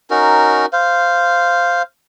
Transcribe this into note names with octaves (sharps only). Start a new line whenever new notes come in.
C#4 D#4 F#4 A#4
C5 F5